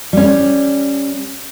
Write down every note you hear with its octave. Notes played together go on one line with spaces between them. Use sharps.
G3 C#4